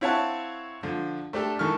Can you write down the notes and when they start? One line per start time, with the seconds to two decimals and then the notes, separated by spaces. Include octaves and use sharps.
0.01 C4 E4 C#5 F5 F#5 A5
0.83 D3 F3
1.33 A3 D4 G4 A4
1.59 D#3 E3 A4 C#6 F6